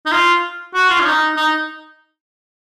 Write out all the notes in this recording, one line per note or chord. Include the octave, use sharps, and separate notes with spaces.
D#4
F4
F#4
F4
C#4
D#4
D#4